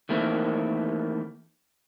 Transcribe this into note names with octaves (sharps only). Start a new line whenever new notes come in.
D#3 E3 A3 A#3 C4